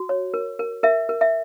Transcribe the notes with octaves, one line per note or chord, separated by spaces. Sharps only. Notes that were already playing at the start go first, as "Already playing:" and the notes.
Already playing: F#4
C#5
A#4
A#4
A#4 E5
A#4
E5